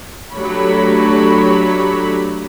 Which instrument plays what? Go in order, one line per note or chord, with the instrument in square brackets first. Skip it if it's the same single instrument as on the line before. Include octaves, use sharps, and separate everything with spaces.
[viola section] F#3 A3 D4 G4 C#5 B5